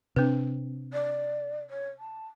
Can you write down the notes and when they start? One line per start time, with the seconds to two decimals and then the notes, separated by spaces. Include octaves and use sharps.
0.16 C3 C4 D4 B4
0.93 D5
1.70 C#5
1.99 A5